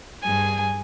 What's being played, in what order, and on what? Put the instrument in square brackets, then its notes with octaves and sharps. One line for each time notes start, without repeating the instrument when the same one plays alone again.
[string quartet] G2 G#4 G#5